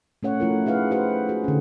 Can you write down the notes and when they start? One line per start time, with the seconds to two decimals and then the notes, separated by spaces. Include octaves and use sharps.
0.23 A3 C#4 C#5 F#5
0.40 F3 A3 E4 F4 A#4
0.66 D#4 G#4 B4 F5 F#5
0.91 F#4 G4 B4 C5 F#5
1.29 F4 F#4 G#4
1.44 D3 C#4